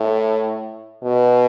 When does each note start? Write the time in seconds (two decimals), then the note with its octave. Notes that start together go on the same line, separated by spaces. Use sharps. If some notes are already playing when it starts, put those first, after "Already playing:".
Already playing: A2
1.03 B2